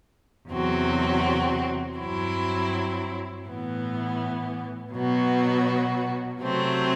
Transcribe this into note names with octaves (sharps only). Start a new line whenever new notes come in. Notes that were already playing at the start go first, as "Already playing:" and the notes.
E2 C3 F#3 C4 F#4
G2 F#3 C4 E4
A2 E3 B3
B2 F#3 B3 F#4
C3 F#3 A3 C4